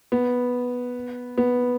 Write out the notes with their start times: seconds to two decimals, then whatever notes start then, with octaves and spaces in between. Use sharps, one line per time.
0.12 B3
1.38 B3